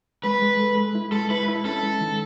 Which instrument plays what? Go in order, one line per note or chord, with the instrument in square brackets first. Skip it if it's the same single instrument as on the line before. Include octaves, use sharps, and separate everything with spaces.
[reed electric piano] G#3 [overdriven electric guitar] B4
[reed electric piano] G#3
A4
G#3
E4
[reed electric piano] G#3 [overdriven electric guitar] A4
[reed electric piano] E4 [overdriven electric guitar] B4
[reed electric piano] E4
[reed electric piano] C#4 [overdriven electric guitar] A4
[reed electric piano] G#3
D#3